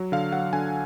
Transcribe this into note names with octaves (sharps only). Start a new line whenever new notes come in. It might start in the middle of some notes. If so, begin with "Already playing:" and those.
Already playing: F#3
D3 F5
F#3 F#5
D3 G#5